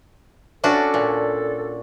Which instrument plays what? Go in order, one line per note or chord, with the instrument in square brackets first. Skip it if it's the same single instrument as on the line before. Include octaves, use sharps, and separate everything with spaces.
[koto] C#4 D4 F#4 [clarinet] A4
[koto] A#2